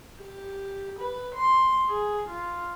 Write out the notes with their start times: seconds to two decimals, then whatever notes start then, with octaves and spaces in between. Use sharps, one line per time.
0.19 G4
0.99 B4
1.35 C6
1.89 G#4
2.29 F4